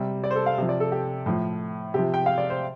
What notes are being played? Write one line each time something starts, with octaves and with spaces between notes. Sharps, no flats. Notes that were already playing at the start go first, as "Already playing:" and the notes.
Already playing: C3 G3
D5
C5
A4
F5
C3 F3
D5
A4
G4
A2 F3
C3 F3 G4
G5
F5
D5
C5